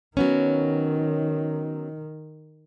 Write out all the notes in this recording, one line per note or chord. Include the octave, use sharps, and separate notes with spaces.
D#3 F#3 B3 C#4